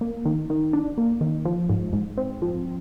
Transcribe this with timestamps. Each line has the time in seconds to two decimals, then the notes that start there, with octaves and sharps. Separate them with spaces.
0.01 A#3
0.25 D#3
0.50 D#3
0.73 D4
0.98 A#3
1.21 D#3
1.45 F3
1.69 G#2
1.93 G#2
2.18 C4
2.42 F3